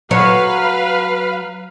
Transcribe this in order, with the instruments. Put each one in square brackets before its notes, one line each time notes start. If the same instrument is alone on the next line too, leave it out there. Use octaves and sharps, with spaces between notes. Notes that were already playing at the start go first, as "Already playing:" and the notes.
[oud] F#3 C#5 [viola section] B4 F5